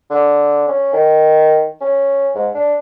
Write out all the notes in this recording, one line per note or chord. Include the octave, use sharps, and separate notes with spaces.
D3
C#4
D#3
C#4
G#2
D4